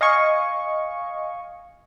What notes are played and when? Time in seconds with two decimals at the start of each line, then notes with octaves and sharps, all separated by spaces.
0.01 D#5 F5 G#5 C#6